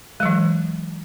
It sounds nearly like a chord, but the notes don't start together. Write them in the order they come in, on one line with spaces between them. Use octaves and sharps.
G#3 F#3 E3